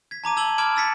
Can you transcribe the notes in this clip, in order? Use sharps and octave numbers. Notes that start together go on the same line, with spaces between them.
G#6 B6
A5 A#5 D6 D#7
A5 E6 G#6 D#7 F#7 G7
B5 D6 F6 G#6 D7 E7
E6 A6 B6 C#7